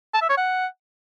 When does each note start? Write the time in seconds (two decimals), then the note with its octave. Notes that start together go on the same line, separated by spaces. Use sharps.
0.14 A5
0.22 E5
0.30 C#5
0.37 F#5